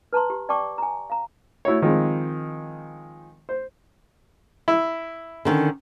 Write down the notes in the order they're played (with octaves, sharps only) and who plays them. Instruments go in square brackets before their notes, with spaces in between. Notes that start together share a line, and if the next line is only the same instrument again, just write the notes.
[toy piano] B4 A5 A#5 C6
G4
D5 G5 A5 C#6 D6
G#5 A#5
F5 A#5
[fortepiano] A3 E4 F#4 C#5
D#3 F3 G#3 C4
C5
E4
[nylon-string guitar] D3 D#3 C#4